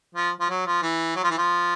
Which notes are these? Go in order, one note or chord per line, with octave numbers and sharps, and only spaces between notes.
F3
F3
F#3
F3
E3
F#3
F3
E3
F3